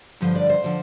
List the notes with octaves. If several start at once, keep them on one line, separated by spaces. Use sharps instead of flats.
G2 D3 F3 C5
D5
C5
D3 F3